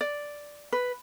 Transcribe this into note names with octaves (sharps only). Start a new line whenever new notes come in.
D5
B4